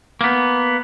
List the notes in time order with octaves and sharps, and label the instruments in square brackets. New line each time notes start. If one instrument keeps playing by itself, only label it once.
[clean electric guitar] A#3 B3